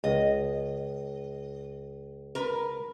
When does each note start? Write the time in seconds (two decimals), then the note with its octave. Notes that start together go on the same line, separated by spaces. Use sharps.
0.04 C#2 D#5
2.35 A#4 B4